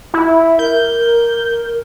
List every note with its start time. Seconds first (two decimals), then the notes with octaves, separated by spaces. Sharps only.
0.14 E4
0.59 A#4 G6